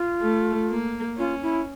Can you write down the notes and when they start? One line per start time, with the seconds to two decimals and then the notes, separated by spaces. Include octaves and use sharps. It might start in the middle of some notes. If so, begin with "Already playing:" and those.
Already playing: F4
0.22 A3
0.70 A#3
1.17 C#4 F4
1.42 E4